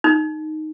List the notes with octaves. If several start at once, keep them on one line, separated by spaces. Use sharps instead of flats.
D#4